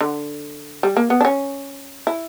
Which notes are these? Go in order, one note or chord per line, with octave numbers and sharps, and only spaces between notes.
D3
G3
A#3
B3
D4
C#4
E4